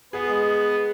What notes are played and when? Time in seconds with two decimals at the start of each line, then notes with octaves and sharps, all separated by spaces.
0.13 B3 G#4
0.27 G#3